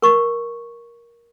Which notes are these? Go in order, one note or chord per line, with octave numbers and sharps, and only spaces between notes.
A#4 C#6